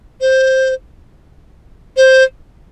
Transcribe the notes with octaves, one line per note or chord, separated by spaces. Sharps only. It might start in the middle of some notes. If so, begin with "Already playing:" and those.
C5
C5